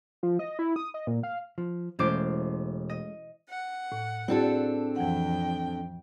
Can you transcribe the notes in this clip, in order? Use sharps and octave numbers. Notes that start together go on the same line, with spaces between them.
F3
D#5
E4
D#6
D#5
A#2
F5
F3
E1 G#3 A3 C#4 C5 D6
D#5
F#5
A2
C4 D4 E4 F#4 G#4 A4
F2 E3 F#5 G5